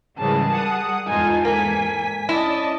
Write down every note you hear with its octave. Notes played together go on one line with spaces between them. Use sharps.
G#2 C#3 E3 G3 G#4 A#4 A5
F#5 D#6
E2 G#2 D#4 F4 A4 G#5
A#3 G#5 B6
C#4 E4 D5 D#5 A5